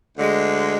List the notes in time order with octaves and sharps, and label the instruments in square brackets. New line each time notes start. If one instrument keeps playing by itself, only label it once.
[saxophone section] D2 D3 G#3